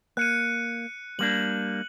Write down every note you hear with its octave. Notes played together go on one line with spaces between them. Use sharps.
A#3 F#6 C#7 D#7
G3 A#3 D4 F#7